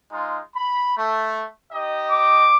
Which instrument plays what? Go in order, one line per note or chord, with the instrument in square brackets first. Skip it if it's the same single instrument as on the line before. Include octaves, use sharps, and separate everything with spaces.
[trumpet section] G#3 D#4 F4
B5
A3
D#4 G4 D#5
[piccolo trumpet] D6